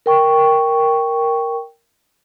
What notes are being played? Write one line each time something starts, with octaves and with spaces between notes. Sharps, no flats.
A#4 G5 C#6